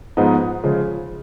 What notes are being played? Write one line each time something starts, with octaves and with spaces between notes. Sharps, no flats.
G#2 F3 G#3 B3 D#4
C#3 F3 G#3